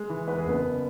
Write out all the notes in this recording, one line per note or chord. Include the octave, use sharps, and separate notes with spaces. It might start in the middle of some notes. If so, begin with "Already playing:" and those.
Already playing: G#3
E3
E2 B4
G#4
F#1 B3 B4
F#1